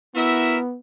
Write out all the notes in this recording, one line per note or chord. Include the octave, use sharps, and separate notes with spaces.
B3 E4 F#4 A#4 E5